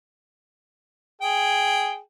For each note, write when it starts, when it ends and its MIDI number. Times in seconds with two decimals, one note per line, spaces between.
1.21 1.98 68
1.21 1.98 79